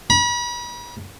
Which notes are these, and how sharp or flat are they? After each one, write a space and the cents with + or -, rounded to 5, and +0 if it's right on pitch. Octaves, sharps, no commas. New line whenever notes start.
B5 -40